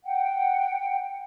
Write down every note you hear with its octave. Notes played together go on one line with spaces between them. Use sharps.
F#5 G5